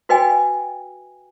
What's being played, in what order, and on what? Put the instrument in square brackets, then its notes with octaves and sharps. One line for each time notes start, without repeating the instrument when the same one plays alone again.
[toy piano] F#4 B4 D#5 G5 G#5